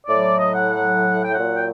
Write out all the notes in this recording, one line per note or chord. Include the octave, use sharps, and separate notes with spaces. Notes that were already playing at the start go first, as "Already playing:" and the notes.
A2 F#3 D5
D#5
F#5
F#5
G5
A#2 F#3 F#5
G5